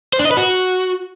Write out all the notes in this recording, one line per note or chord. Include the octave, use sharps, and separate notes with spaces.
C5
D4
D#5
B4
F#4